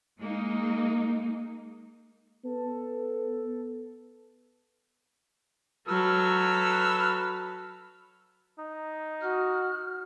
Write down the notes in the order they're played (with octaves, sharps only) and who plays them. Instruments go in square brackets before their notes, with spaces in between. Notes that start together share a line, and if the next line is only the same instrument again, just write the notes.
[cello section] G#3 A#3 D#4
[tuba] B3 [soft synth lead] A4
[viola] F#3 A4 [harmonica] B4 E6 F6
[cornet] D#4
[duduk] F#4 [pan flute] F6